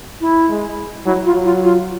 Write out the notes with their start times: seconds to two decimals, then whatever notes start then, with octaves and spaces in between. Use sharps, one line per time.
0.20 E4
0.49 G#3
1.05 F#3 E4
1.25 F4
1.34 F#3
1.44 F4
1.63 F4